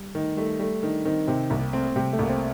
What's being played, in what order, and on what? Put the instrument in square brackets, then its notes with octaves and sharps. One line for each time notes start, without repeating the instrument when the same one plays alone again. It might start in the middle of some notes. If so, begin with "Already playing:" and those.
Already playing: [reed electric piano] G3
[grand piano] D#3 [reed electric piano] A3
[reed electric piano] G3 [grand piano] A3
[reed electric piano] G3 [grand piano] A3
[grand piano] D#3 [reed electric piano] D4
[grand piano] D#3 [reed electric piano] C4
[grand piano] C3 [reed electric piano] C4
[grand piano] C2 [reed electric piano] A#3
[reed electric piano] A3 [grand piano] C4
[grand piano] C3 [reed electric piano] G3
[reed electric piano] A3
[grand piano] C2 [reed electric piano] A#3
[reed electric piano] C4